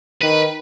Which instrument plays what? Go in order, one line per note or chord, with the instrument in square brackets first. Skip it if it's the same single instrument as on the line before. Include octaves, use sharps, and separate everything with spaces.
[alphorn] D#3 [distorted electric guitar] B4